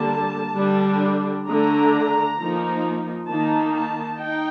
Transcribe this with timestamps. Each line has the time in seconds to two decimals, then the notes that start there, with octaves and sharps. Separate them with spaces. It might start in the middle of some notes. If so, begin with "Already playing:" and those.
Already playing: D3 G3 A#3 A5
0.55 D3 G3 D4
1.47 D3 A3 D4 A#5
2.38 F3 A#3 D#4
3.29 D#3 A#3 D#4 A5
3.75 A5
4.20 D#4 G5